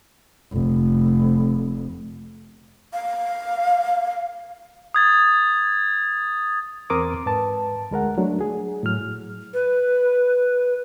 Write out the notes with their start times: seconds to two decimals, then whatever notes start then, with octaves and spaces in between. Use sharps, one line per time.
0.52 F1
2.93 F5
4.94 D#6 G#6 A6
6.90 E2 C4 A#4 C6 D6 D#6
7.26 G#2 B4 A5
7.91 D2 G#3 A#4 F#5
8.18 F#3 A3 D4
8.41 G#4
8.83 A2 F#3 F6
9.54 B4